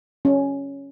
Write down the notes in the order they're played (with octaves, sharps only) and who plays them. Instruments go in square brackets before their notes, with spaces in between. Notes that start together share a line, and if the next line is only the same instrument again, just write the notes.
[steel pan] C#4